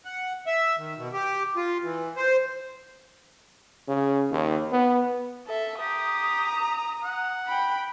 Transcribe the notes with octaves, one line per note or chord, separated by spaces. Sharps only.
F#5
E5
D#3
B2
G4
F4
E3
C5
C#3
D#2
B3
A4 E5
G4 A#5 D#6
F#5
G5 B5